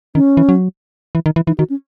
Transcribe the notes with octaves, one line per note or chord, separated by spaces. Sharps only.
D#3 C#4
E3
F#3
E3
D#3
E3
E3 D#4
D#3 F#4
C#4